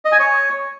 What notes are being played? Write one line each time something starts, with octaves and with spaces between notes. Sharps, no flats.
D#5
G#5
C#5